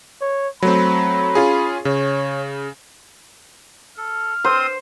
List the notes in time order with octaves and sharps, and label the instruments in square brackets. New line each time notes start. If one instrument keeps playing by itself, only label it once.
[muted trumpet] C#5
[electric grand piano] F#3 A3 C4 [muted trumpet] B5
[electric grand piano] C#4 F4 G#4
[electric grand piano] C#3 [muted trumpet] C#5
[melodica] A4 [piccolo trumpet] F6
[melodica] C4 C6 D#6 [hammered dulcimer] C5